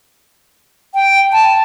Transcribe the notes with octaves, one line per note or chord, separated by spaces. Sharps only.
G5
A5